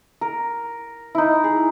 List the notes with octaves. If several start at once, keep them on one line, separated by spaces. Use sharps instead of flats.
A#4
D#4 E4
G#4